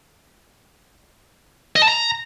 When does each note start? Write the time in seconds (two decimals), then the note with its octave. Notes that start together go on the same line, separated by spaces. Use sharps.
1.76 D#5
1.82 A5
1.88 A#5